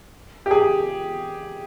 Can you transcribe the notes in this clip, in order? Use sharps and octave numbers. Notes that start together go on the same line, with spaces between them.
G4
G#4